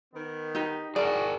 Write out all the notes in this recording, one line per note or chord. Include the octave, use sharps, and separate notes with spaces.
D#3 B3
D#4 G4
E4 F#4 G#4 A#4 D5 G#5